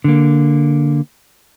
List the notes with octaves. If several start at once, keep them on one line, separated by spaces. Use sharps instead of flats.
D3 A#3